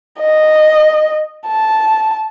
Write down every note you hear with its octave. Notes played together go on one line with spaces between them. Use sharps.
D#5
A5